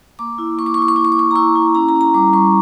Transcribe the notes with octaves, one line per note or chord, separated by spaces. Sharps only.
A#3 D6
E4
A#3 C#6
D6
C#6
E4 D6
C#6
E4 D6
C#6
D6
E4 C#6
A#5
E4 C#6
E4
C#4 A#5
A#5
C#4
A#5
G3 D6
G3 C#6